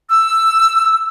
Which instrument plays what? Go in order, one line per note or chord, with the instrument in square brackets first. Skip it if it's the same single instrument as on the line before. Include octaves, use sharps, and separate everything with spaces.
[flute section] E6